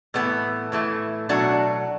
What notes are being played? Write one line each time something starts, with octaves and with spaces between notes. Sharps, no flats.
A2 E3 A3 B3
A2 E3 A3
B2 F#3 A3 D4 F#4